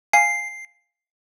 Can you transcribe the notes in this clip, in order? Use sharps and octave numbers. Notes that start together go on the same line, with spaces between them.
F5 G#5 C7